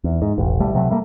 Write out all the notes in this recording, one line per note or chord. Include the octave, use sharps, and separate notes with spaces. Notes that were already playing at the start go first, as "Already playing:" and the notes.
E2
G#2
E1 A1
D1 B1 G3 A3
C3 F#3 A3
G3 A3 A#3